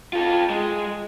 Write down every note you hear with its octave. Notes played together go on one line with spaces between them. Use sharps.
F4 A4
G#3